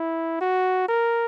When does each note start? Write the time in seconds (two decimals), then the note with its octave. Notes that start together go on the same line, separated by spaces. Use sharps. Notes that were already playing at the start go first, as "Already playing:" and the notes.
Already playing: E4
0.41 F#4
0.88 A#4